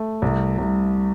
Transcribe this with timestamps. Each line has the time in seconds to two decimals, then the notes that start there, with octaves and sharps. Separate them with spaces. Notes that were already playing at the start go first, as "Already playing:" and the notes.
Already playing: A3
0.22 C2
0.58 C2